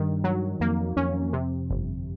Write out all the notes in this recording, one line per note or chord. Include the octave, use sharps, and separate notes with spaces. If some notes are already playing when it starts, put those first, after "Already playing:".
Already playing: G2 D#3
F#3
F2 A#3
F2 C#4
C3
G1